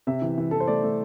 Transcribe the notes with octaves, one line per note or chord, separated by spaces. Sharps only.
C3 E5
E3
E3
E3 A4
C5
A3 D5
A3